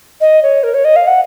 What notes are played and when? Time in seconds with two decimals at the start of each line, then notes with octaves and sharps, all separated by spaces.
0.21 D#5
0.43 C#5
0.64 A#4
0.74 C#5
0.85 D#5
0.96 F5
1.07 F#5